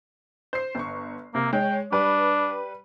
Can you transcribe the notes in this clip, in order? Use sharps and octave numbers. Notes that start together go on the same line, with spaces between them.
C5 C7
G1 C#6
C3 A#3
G#3 C#5 G5
G3 D4 B4